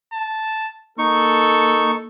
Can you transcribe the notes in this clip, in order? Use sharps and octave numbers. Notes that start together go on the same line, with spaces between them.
A5
A#3 D#4 A4 C#6